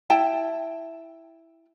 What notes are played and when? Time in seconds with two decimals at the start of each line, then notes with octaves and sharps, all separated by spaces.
0.10 E4 G5 A5